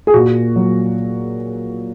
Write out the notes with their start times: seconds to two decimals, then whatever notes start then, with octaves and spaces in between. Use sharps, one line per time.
0.07 G#4
0.14 A#2 F#4
0.56 F#3